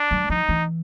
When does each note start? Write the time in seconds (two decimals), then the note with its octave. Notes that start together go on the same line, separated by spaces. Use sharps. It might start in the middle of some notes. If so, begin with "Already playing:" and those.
Already playing: D4
0.11 F#3
0.30 F3 D#4
0.49 E3